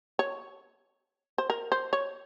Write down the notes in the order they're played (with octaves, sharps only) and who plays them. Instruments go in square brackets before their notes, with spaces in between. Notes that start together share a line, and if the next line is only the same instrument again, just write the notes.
[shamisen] C#5
C5
A#4
C5
C#5